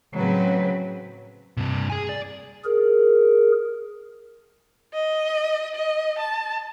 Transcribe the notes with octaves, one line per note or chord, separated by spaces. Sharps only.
A2 C#3 F#3 C4 B4
G2 C3
G#4 G#5
D5
G#4 A#4
D#5
D#5
A5